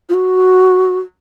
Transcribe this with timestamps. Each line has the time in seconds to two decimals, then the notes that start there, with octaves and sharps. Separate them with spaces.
0.09 F4
0.14 F#4